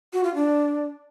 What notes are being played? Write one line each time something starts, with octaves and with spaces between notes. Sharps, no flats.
F#4
F4
D4